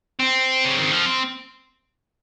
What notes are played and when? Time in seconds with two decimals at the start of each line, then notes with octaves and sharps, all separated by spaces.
0.20 C4
0.65 C#3
0.78 D#3
0.91 F3